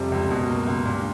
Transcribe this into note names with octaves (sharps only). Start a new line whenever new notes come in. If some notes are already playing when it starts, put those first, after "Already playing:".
Already playing: F2 C3 G3
C#2
F#2 B2
A#3
C#2
G2 A#2